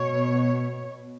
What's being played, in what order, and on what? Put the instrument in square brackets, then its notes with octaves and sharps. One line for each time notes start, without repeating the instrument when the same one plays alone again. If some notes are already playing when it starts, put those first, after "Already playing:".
Already playing: [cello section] B2 C#5